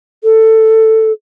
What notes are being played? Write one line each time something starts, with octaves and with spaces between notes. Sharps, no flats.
A4